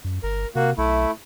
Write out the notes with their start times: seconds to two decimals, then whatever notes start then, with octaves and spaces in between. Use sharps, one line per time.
0.04 F#2
0.23 G1 A#4
0.55 C3 A#3 F#4
0.78 B1 A3 E4